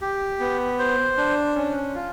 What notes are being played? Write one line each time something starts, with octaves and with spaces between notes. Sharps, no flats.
G4
B3
C5
D4
C#4
F4